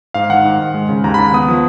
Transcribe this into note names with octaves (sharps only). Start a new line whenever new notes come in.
G#2 F5
D#3 F#5
G#2
G#2
G#3
C#3
D#2 A#5
D#2 B5
B3 D#6
F3